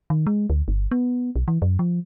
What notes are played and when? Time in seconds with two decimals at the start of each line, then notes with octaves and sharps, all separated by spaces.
0.10 D#3
0.27 G#3
0.50 D2
0.68 G1
0.91 B3
1.36 B1
1.48 E3
1.62 F#2
1.79 F3